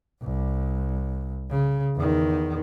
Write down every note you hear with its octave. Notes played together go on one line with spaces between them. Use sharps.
C2
C#3
E2 D#3